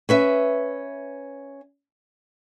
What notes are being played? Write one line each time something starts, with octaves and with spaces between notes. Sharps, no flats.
C#4 B4 E5